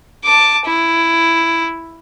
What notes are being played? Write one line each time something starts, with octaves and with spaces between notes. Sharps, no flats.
A5 D6
E4